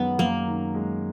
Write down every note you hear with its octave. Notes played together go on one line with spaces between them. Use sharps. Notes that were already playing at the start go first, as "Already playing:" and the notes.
Already playing: F#2 D#3 G#3 B3
F#2 A#3
D#3
G#3